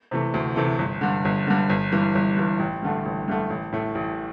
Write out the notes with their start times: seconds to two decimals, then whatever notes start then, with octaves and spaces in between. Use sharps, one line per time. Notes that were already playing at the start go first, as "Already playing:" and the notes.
0.11 C3 E3 A3
0.34 D2
0.56 C3 E3 A3
0.78 G1
1.01 G2 D3
1.25 G1
1.47 G2 D3
1.69 G1
1.92 G2 E3
2.15 G1
2.36 G2 E3
2.59 A1
2.82 G2 D3 A3
3.05 A1
3.28 G2 D3 A3
3.50 A1
3.72 A2 A3
3.95 A1